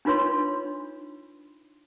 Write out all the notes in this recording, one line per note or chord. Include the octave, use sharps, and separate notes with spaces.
D4 D#4 F4 B4 C#5 C6